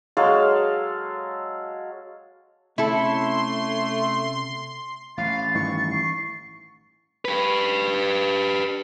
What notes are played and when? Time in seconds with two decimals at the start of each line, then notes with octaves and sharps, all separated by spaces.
0.17 F#3 G#3 A4 F5
2.78 C3 A3 C#4 E4 A4 C6
5.18 A1 F5 A6
5.55 G2 D#3 E3 C#6
5.91 C7
7.25 G4 B4